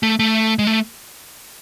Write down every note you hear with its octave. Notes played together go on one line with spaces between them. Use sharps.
A3
A3
G#3
A3